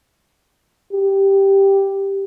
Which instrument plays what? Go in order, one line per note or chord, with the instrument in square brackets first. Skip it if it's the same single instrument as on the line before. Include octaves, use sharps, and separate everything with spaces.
[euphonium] G4